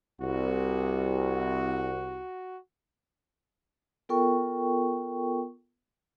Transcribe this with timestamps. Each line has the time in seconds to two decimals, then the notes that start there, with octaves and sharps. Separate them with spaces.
0.22 C2 F#4
4.09 B3 F4 A4 A#4 G5 C#6